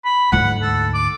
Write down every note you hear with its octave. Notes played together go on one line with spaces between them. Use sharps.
B5
D2 G#2 F#5
A4
D6